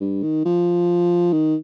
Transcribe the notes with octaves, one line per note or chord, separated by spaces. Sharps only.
G2
D#3
F3
D#3